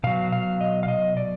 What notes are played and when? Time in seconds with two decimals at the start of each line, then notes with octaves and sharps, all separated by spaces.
0.04 B2 F#3 F5
0.32 F5
0.61 D#5
0.83 F5
0.88 D#5
1.17 D5